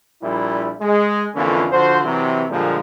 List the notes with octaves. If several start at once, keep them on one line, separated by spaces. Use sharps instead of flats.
A#1 A#2 G3 E4
G#3
F2 D3 E3 A#3 C#4 F4
D3 F3 F#4 C5
C3 E3 F#3
A#2 D3 F3 G3 G#3 A#3